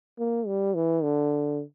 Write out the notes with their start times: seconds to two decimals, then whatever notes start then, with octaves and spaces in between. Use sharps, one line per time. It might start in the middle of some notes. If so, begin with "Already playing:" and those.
0.19 A#3
0.47 G3
0.75 E3
1.03 D3